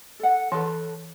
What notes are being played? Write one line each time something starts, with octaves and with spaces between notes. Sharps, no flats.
A4 F#5
E3 A4 B4 A5